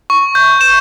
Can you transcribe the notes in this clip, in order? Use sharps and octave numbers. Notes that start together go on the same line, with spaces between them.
C#6
G6
E7